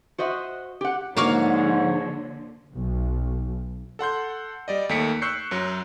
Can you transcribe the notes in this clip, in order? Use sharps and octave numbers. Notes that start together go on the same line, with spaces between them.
F#4 C5 D#5 E5 F#5
G4 F#5
G#2 D3 F3 A#3 F#4 C#5 F5
B1
A4 F#5 C6 G6
G3 D5 D#5
D#2 A3 D#4 B6 C#7 D7
C#6 E6 F#6 G6 C7 C#7
F#2 F#3